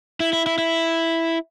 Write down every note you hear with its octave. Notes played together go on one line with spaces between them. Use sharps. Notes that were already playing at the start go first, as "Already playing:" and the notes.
E4
E4
E4
E4